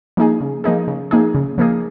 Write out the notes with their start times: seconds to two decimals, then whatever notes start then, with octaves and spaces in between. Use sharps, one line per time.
0.17 F3 A#3 D#4 G#4
0.41 C#3
0.64 F3 A#3 D#4 G#4
0.88 C#3
1.11 F3 A#3 D#4 G#4
1.35 C#3
1.58 F3 A#3 D#4 G#4